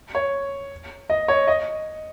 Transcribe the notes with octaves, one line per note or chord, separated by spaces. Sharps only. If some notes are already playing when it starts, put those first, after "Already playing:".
C#5
D#5
C#5
D#5